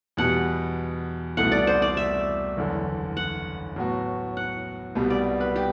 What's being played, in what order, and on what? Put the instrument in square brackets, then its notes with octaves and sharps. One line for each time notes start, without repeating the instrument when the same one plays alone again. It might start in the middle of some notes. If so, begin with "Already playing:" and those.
[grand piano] E2 B2 G3 [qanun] F#5
[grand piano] C2 B2 A3 E4 [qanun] F#5
[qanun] D5
C5
D5
E5
[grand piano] F#1 E2 D3
[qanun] F#5
[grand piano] A2 F#3 B3 F#4
[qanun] F#5
[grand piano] C2 B2 G3 B3
[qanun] D5
B4
G4